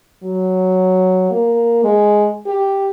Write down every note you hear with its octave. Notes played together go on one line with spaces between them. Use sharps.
F#3
A#3
G#3
G4